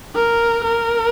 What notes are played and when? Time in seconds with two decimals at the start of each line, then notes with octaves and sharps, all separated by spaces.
0.15 A#4
0.64 A#4